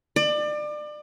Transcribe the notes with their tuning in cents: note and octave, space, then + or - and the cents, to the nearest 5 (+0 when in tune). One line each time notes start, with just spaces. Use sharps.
D5 +30